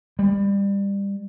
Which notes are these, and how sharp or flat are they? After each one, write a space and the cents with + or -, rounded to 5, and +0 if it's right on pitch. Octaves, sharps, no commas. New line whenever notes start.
G3 +25